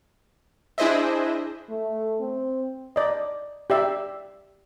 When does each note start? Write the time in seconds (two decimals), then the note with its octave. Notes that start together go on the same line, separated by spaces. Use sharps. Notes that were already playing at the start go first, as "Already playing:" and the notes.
0.78 D4 E4 G#4 C5 D#5 E5
1.70 A3
2.20 C4
2.96 D5 D#5
3.70 G4 D5 E5